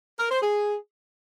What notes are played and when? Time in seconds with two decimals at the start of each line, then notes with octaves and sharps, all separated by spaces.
0.19 A#4
0.31 C5
0.42 G#4